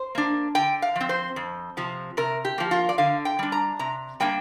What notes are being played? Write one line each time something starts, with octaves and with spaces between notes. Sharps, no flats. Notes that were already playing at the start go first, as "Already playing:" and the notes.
Already playing: C5
A#3 D4
D3 G5
F5
F3 C4
C5
F2
C3 F3
C3 A#4
G4
F3 A#3
F4
D5
D3 F5
G5
G3 D4
A#5
C3 A#5
G3 A#3 D4 G5